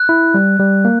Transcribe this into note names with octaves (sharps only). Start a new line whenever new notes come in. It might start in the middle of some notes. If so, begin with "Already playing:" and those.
Already playing: F#6
E4
G3
G3
A#3